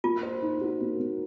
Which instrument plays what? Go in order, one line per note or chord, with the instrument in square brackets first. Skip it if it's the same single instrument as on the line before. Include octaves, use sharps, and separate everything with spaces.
[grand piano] A#3 [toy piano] F4
[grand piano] C5
D#4
F#4
A#3
A#3